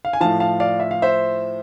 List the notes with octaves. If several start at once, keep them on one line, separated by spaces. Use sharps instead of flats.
F5
G#5
A2 F3 F5 A5
F5 A5
D5 F5
E5
F5
C5 E5